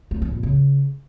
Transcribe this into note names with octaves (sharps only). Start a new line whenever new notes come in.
A3
E3
A#2
C#3